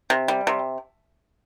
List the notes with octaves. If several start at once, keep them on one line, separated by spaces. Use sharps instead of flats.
C3
G3
C3